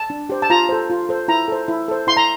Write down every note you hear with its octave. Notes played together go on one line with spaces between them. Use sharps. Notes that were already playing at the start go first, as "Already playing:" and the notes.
Already playing: A5
D4
G4 C5
A5
F4 A#5
A4 C5
F4
A4 C5
E4 A#5
A4 C5
E4
A4 C5
E4 C6
A#5